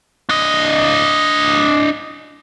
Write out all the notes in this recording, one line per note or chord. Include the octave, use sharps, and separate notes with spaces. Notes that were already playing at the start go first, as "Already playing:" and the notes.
D4 D#5